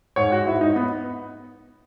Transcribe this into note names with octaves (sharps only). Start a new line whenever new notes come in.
G#2 C#5
F#4
G#2 E4
D#4
B3